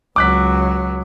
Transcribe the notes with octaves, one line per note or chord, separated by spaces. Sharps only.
C#2 F#3 D6 F#6 B6